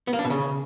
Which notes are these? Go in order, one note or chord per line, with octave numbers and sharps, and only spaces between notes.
B3
A#3
D4
B2
C#3